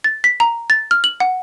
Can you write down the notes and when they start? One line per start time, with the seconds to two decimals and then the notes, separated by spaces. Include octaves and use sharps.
0.04 A6
0.24 B6
0.40 A#5
0.70 A6
0.91 F6
1.04 F#7
1.20 F#5